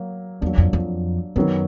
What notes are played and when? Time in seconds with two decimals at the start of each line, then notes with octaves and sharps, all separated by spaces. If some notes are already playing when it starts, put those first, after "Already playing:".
Already playing: F#3 A#3
0.41 E2 F#3 A#3 D4
0.58 F2
0.73 F2
1.36 F#2 D#3 F#3 B3